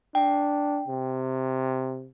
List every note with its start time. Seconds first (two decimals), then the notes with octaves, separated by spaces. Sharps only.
0.15 D4 G5
0.88 C3